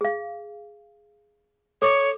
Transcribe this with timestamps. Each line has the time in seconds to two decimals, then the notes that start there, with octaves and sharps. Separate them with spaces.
0.01 G#4 F5
1.82 A4 C#5 D6